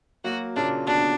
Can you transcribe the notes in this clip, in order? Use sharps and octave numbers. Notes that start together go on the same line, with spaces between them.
F#3 A#3 F#4
A#2 C#3 D4
B2 D3 D4